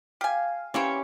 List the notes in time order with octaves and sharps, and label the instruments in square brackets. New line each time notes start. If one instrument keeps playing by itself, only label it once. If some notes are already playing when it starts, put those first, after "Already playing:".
[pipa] G4 G#5 [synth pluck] F5
[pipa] E3 A#3 C4 [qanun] C#4 G4 C#5